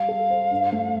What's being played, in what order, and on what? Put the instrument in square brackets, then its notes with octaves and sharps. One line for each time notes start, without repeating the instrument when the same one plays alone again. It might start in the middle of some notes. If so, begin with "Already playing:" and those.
Already playing: [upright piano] G3 [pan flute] F5
[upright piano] A4
C5
G2
A3